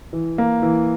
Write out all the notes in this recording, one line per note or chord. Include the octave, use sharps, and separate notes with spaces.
E3
A#3
E3